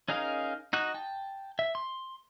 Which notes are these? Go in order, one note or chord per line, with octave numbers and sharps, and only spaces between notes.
C#4 D#4 G#4 A#4 F5
D#4 F#4 F#6
G5 A5
E5
C6